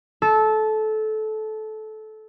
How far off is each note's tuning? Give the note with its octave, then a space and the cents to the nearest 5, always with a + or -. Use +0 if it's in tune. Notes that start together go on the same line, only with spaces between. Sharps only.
A4 -20